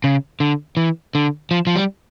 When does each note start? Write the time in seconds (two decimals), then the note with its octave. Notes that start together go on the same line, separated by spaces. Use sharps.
0.04 C#3
0.40 D3
0.77 E3
1.15 D3
1.51 F3
1.67 F3
1.76 G3